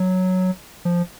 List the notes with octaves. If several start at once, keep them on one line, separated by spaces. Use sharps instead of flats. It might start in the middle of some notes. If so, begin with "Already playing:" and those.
Already playing: F#3
F3